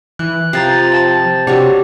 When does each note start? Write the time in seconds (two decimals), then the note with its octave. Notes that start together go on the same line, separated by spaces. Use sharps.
0.19 E3 F#6
0.53 C3 F3 A#4 C5 A#5 A6 C7
0.92 A5 A6
1.47 C3 D4 F#4 G4 C#5